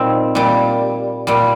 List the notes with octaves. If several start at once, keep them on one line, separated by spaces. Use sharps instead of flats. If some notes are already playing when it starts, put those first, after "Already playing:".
Already playing: A#2 G3 C4 D#4
A#2 G3
A#2 G3